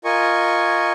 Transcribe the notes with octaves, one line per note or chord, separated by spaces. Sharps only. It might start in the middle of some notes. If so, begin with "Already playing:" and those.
F4 A#4 D#5 G#5 C#6